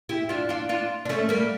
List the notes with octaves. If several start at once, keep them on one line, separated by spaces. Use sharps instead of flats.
E4 G4
D4 F4
D4 F4
D4 F4
D4
A3 C#4
G3 A#3